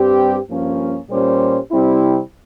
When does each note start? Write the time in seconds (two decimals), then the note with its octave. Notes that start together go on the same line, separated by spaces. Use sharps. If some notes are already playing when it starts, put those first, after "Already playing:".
Already playing: G2 G3 C4 G4
0.50 G2 F3 A#3 C#4
1.11 A#2 G3 C#4 G4 C5
1.71 C3 G3 C4 E4